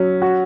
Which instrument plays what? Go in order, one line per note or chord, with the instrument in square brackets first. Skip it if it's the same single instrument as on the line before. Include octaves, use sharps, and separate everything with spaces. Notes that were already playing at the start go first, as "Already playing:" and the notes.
Already playing: [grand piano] F#3 C#4
F#4